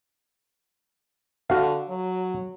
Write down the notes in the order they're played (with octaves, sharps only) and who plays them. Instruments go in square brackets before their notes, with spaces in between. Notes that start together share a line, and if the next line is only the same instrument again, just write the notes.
[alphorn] D3 [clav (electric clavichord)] F#4 F5
[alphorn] F#3